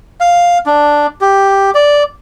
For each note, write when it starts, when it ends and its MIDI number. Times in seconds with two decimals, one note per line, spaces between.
0.20 0.58 77
0.66 1.07 62
1.21 1.71 67
1.75 2.03 74